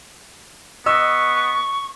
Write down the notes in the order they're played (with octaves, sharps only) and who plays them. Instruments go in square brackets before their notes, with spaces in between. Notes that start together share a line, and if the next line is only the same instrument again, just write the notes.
[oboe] B3 [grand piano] D#5 E6 [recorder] C#6